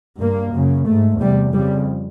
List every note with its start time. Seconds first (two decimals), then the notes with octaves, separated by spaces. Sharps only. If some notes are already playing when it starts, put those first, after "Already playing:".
0.21 G2 A#3
0.55 F#2 C#3
0.87 G#2 A3
1.20 E2 C3 G3
1.53 F2 C#3 G3